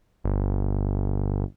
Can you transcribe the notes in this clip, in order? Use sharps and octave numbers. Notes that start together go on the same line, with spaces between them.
G1